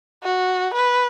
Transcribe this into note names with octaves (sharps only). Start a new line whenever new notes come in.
F#4
B4